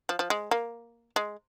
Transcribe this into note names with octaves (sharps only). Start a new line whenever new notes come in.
F3
F3
G#3
A#3
G#3